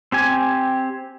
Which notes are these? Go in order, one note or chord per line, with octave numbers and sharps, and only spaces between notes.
C4 G4 G#5